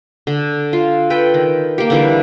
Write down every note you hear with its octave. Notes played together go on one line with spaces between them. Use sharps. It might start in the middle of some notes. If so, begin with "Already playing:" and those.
D3
F4
A4 B4 G5
D#3
A#3 G4
D3 E3 G3